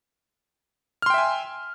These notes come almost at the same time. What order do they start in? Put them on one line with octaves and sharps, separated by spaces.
F6 C6 G5 E5 G#5